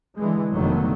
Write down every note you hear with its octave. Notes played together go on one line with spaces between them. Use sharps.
D3 E3 G#3
F1 D3 D#3 F#3 A3 B3